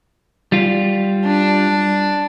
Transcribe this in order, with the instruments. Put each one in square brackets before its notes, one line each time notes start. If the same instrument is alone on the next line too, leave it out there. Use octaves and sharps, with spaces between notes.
[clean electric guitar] G3 F4
[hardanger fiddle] D4